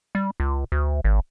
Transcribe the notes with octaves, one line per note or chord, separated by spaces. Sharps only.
G3
C#2
D2
G#1